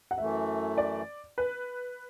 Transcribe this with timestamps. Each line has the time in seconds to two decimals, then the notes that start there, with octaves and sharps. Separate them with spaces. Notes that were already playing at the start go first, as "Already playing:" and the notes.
0.11 F#5
0.18 F#2 E3 A3 E5
0.78 D5
1.38 B4